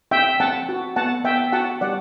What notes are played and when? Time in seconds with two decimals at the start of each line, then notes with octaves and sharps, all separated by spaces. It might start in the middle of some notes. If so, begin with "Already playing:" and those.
0.11 C4 E5 G5
0.40 C4 F#5 A5
0.69 F#4
0.96 B3 F#5 A5
1.24 B3 E5 G5
1.52 F#4 F#5 A5
1.81 G3 D5 F#5